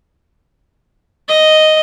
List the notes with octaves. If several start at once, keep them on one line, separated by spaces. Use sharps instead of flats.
D#5